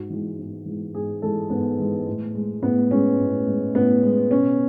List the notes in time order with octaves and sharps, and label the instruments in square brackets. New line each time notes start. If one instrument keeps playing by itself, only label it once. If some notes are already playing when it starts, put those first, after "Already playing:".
Already playing: [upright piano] G#2 F#4
E3 G#3
G#2
E3 G#3
G#2 G#4
E3 G#3 A4
G#2 B3
E3 G#3
A2
G#3
A2 B3
G#3 C#4
A2
G#3
A2 B3
G#3
B2 C#4